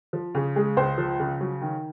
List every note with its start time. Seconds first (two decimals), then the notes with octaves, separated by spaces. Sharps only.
0.13 F3
0.35 C#3 G#4
0.56 G#3 G#4
0.77 C#2 C5
0.98 F3
1.20 C#3
1.41 F#3
1.62 D#3